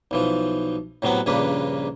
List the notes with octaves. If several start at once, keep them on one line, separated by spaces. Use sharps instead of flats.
B1 E3 F3
A2 C3 F#3 B3 F#5
A#1 G2 C#3 A#3 D4 B4